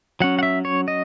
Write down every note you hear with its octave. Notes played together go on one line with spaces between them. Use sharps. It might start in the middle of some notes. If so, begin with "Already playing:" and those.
F#3 C#4 F#5
F#5
E5
C#5
D#5